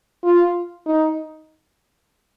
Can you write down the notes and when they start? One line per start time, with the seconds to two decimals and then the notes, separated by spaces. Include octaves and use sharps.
0.24 F4
0.86 D#4